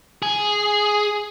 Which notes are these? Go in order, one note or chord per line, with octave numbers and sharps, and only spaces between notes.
G#4